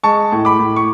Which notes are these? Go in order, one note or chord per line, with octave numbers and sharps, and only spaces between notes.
G#3 A5 C#6
A2
B5 D6
A2
C#6